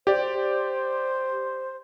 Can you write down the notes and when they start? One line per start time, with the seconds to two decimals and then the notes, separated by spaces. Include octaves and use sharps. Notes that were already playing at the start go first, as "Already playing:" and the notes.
0.07 G4 C5 D5